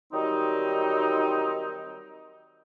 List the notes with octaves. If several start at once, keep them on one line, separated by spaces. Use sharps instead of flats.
D#3 F#3 G3 C4 D#4